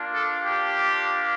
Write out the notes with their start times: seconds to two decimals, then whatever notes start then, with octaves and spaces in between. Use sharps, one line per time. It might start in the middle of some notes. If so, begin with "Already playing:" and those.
Already playing: A#3 D4 F4
0.14 A4
0.43 G4